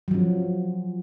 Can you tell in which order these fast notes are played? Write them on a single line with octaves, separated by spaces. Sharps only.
F#3 F3 C#4